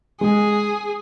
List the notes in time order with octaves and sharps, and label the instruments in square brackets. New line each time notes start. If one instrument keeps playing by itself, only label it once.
[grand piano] G#3 [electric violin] G#4